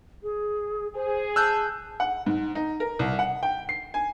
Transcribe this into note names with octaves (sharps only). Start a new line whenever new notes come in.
G#4
G#4 C5
A5 E6 F#6 G6
F#5
G#2
D#4
A#4
C2
F#5
G5
C7
G#5